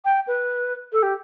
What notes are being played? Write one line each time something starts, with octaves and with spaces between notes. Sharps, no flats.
G5
B4
A4
G4